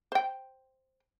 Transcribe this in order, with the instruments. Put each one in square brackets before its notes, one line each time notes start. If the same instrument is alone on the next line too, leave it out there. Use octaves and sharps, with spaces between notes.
[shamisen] C5 G5